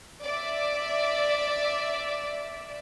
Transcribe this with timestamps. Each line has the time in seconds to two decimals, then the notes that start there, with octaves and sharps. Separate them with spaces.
0.23 D5 E5